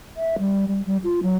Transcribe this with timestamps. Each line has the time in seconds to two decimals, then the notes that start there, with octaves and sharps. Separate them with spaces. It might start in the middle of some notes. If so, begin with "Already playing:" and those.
0.17 E5
0.39 G3
0.68 G3
0.86 G3
1.04 F4
1.23 F#3